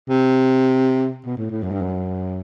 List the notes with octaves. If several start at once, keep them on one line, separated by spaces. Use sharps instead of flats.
C3
B2
A2
A2
F#2
G2
F#2